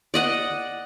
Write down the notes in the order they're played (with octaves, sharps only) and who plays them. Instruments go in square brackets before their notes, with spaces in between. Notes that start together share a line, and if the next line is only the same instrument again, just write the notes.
[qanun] D5 D#5 F#5